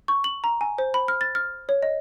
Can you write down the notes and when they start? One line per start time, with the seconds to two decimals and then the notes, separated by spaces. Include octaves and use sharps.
0.08 C#6
0.24 F#7
0.44 A#5
0.61 G#5
0.78 C5
0.94 B5
1.08 F6
1.21 A6
1.35 F6
1.69 C#5
1.83 D#5